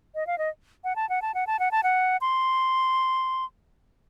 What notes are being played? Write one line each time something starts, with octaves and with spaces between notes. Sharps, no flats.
D#5
F5
D#5
F#5
A5
F#5
A5
F#5
A5
F#5
A5
F#5
C6